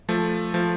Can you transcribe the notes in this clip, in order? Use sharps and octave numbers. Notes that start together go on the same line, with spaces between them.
F3 A3
F3 A3